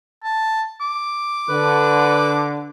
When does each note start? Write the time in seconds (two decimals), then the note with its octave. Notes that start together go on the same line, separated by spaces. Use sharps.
0.24 A5
0.81 D6
1.49 D3 B4